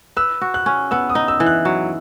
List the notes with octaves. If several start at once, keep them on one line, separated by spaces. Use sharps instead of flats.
B4 E6
F#4
F#6
C#4
B3 E6
D#6
D#4
E6
E3
F#6
F#3